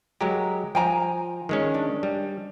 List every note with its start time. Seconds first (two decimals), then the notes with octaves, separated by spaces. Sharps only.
0.21 F#3 G#3 G4 A#4
0.75 F3 G5 G#5 A#5
1.49 D#3 G#3 C#4
1.74 D4
2.03 G3